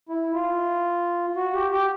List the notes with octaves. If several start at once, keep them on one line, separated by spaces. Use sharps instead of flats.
E4
F4
F#4
G4
G4